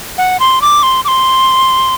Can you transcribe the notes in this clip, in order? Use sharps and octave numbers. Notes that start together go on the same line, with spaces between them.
F#5
C6
D6
C6
D6
C6